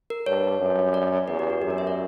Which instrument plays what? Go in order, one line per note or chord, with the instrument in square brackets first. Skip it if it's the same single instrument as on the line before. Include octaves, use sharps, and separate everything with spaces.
[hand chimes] A#4
[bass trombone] G2 [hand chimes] C#5
[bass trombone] F#2
[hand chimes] D5
[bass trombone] E2 [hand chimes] B4
[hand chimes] G4
F#4
[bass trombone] F#2 [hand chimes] G4
[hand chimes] A#4
E5
D5